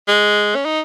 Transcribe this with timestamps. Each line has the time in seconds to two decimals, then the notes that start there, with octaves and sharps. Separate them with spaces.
0.08 G#3
0.55 C#4
0.65 D#4